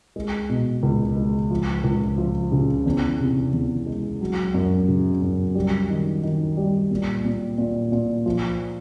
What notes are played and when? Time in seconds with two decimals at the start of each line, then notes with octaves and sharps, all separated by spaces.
0.16 G#3
0.49 B2
0.83 C#2
1.17 G#3
1.50 F3
1.84 C#2
2.18 F3
2.52 C#3
2.86 E2
3.19 C3
3.53 E2
3.86 G#3
4.21 F#3
4.54 F#2
4.88 C#3
5.22 F#2
5.55 G3
5.89 D#3
6.23 D#3
6.57 G3
6.90 A#2
7.24 A#2
7.58 A#2
7.92 A#2
8.26 F3